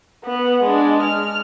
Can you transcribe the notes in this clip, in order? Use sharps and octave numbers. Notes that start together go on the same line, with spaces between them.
B3
G#3 D4
F6